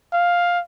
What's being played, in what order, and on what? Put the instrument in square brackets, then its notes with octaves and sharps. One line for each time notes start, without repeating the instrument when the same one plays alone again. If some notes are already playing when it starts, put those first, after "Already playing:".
[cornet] F5